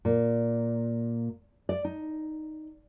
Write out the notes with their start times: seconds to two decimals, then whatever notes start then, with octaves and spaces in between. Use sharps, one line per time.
0.05 A#2
1.69 D5
1.85 D#4